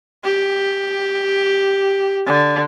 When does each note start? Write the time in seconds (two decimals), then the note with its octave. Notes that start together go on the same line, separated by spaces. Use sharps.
0.24 G4
2.27 D3